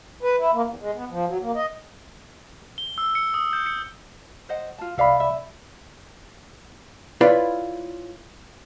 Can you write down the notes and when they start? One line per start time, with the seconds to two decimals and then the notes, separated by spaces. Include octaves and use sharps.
0.23 B4
0.39 E4
0.53 A#3
0.66 E2
0.81 G#3
0.95 B3
1.11 F3
1.27 F#3
1.41 A#3
1.55 D#5
2.78 G7
2.98 E6
3.15 C#7
3.34 D#6
3.53 G6
3.66 C#7
4.49 C5 D#5 F#5
4.78 F4 A5
4.98 C2 A4 D5 E5 F5 B5
5.20 E5
7.21 E4 F4 B4 C#5 D5 F5